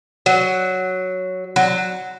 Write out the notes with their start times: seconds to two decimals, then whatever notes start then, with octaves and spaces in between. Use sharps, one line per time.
0.26 F#3
1.56 F#3